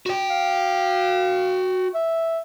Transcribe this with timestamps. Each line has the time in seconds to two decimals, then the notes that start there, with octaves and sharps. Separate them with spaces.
0.06 F#4 G5
0.30 F5
1.95 E5